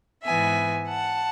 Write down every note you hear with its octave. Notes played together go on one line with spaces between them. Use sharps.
G#2 E3 B3 E5 G#5
F#5 A5